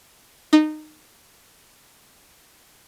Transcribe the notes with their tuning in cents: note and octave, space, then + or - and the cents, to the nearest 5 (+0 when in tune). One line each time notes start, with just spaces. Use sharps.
D#4 -20